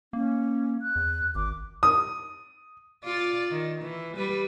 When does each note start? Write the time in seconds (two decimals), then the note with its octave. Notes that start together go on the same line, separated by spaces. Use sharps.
0.13 A#3 C#4
0.82 F#6
0.96 E2
1.35 G#1 D6
1.83 D#6
3.04 F4 D5
3.51 D#3
3.82 E3
4.16 G3 B4